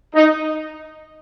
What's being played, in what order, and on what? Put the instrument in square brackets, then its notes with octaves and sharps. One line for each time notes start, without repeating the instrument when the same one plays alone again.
[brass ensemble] D#4